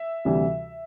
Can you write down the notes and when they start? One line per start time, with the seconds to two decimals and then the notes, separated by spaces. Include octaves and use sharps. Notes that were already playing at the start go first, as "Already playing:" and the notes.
Already playing: E5
0.25 D2 C3 E3 G3